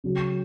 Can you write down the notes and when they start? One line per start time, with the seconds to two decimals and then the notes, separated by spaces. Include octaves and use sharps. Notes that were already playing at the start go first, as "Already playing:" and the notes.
0.04 C#3 F#3 C#4